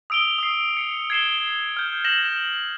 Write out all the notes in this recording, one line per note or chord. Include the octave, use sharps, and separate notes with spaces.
D#6 E6 D7 F7 G7
D#6 C7
C#7
G#6 C7 E7 G7
F6 G6
G6 A#6 E7 F#7